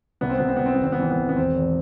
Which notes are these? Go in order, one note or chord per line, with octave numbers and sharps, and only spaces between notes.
C2 B3
C4
C2 B3
C4
C2 B3
C4
B3
G#1 C4
B3
E3 C4
B3
G#1
B3
E1 C4
E2